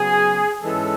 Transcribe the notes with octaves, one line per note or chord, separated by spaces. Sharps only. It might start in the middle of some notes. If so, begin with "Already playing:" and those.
Already playing: C#3 F#3 B3 G#4
G#2 E3 G#3 C#4 A4